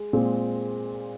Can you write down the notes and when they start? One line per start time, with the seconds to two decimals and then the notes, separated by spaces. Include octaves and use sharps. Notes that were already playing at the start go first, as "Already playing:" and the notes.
Already playing: G#3
0.13 A#2 G#3 C4